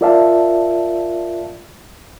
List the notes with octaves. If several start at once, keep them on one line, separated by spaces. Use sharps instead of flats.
F4 A#4 D5 E5 F5 A5